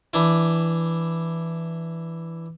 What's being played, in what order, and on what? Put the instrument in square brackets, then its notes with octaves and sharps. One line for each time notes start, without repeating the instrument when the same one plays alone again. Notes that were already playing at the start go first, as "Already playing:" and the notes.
[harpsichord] E3 D4 E4